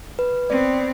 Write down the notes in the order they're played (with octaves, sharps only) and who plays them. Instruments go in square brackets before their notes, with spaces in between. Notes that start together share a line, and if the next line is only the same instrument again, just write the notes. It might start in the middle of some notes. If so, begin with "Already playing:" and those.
[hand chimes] B4
[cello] B3 C4 [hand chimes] D5